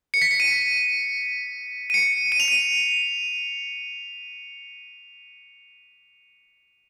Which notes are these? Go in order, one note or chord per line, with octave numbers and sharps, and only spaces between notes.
C#7
B6
C#7
D#7
D#7
C#7
D#7
F7
D#7